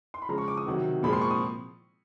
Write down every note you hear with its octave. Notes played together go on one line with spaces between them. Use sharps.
C6
B5
C#3 F3 G#3 A#5
C#6
D6
D#6
C3 D#3 F#3
A#2 F3 G#3 C4 B5
C6
C#6
D#6